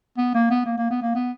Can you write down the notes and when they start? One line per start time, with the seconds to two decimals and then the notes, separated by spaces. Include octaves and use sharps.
0.18 B3
0.35 A#3
0.51 B3
0.66 A#3
0.78 A#3
0.91 B3
1.02 A#3
1.15 B3